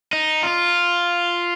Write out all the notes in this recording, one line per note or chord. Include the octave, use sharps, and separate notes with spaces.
D#4
F4